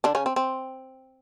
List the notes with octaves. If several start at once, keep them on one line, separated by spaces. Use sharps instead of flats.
D3 D4
C#3 C#4
C4
C4